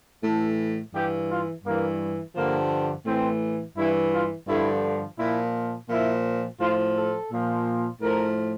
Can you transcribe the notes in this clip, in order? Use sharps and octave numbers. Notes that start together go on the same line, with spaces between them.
A2 E3 A4
G2 E3 G4
F4
G2 E3 A#3
G2 D3 F3 A#3
A2 E3 C4
G2 E3 E4
F4
G2 D3 F3 E4
A#2 F3 E4
A#2 F3 E4
A2 F3 F4
A4
A#2 F3
A2 F3 A#4